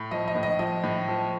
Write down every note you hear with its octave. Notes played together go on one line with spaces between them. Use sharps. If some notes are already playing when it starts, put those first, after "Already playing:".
Already playing: A2
F3 D#5
D#5
A2
D#5
F3 D#5
A2
F3